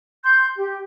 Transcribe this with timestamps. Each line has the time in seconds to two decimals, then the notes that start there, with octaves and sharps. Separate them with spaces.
0.24 C6 G6
0.57 G4